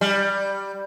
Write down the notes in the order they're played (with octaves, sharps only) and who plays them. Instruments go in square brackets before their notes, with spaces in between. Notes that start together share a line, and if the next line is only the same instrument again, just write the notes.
[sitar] G3